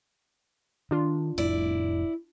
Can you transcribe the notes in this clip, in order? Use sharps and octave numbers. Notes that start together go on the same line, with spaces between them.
D#3 D4 F4
F1 F2 A2 E4 D5